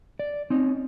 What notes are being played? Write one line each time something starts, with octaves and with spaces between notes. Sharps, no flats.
D5
C4 C#4 D#4